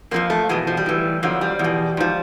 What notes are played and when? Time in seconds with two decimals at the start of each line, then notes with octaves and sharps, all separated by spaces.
0.11 F2 D3 F3 A#3
0.30 A3
0.49 E2 B2 G#3
0.67 F3
0.77 G3
0.86 A2 E3
1.23 F2 D3 F3 F#3
1.41 G3
1.59 E2
1.64 B2
1.97 G#2 F3